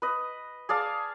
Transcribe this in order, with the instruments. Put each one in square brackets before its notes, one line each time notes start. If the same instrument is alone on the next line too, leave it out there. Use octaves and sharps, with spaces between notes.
[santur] B4 D#5
G#4 D5 F5 A5